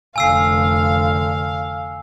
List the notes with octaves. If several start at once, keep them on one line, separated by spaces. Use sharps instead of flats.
F1 D3 F5 G#5 E6 C7